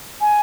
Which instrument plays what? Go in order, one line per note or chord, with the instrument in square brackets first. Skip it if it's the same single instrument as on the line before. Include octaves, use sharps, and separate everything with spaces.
[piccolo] G#5